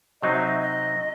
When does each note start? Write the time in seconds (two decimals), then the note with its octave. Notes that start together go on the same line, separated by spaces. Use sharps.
0.22 C3 F#3 C4 D#4 D#5
0.35 E5
0.48 D#5
0.61 D#5